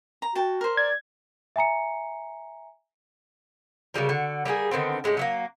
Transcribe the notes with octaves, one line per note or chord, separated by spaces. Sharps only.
A#5
F#4 G5 A5
A#4 C5
D5 G#6
E5 G#5 A#5 C#7
C#3 F#3 G3 A#4
D3 F#4
G3 A#3 F#4 G#4
D3 D#3 B3 C4
A2 G#3 C#4 G4
F#3 A3 A#3